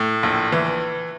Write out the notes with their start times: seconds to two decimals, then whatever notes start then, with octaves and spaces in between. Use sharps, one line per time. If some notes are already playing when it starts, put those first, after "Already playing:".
Already playing: A2
0.23 A#1
0.52 E3